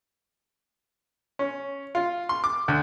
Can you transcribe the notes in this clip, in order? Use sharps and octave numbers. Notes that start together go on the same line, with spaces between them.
C#4
F4
C6
D6
D2